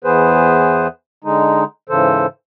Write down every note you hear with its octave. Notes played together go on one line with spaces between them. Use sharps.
E2 E3 B3 G#4 B4 C5
D3 G#3 D#4
G#2 C#3 E3 A4 C5